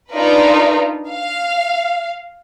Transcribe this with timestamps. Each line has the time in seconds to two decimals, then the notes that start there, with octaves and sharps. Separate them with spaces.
0.11 D4 D#4 F4 A#4 B4
1.09 F5